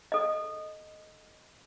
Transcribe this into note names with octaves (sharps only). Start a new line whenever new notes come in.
A4 D#5